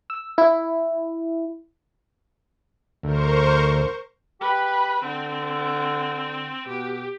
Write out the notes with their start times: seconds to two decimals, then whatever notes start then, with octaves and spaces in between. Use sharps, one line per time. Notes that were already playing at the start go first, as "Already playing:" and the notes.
0.10 E6
0.38 E4
3.03 D2 A#4 C5 C#6
4.41 G4 B4
5.04 D3 C4
6.68 B2 G4